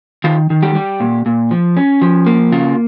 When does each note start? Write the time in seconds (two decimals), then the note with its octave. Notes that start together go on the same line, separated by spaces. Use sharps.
0.24 D#3 F4
0.50 D#3
0.62 G3 G4
0.75 G3
1.00 A#2
1.26 A#2
1.51 F3
1.77 C#4
2.02 F3
2.26 A#3
2.52 C#3 F4